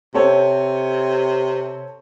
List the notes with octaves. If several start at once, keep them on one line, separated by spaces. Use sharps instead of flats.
C3 C4 A4 C#5